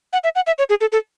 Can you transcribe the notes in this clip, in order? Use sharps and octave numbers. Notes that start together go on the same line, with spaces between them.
F#5
E5
F#5
E5
C#5
G#4
A4
A4